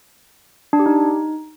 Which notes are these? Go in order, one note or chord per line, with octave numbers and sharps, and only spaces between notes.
D4
G4
D#4